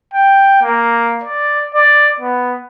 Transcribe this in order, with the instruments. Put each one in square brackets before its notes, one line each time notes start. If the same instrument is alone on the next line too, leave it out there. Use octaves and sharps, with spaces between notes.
[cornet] G5
A#3
D5
D5
B3